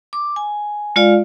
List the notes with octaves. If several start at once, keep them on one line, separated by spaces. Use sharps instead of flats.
D6
G#5
G#3 F4 D5 F5